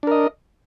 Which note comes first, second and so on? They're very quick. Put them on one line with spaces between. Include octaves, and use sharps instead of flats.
D4 A#4 D#5